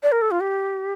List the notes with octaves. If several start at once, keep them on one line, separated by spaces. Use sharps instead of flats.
D5
A#4
A4
F4
G4